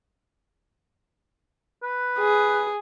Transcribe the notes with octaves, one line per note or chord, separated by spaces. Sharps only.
B4
G#4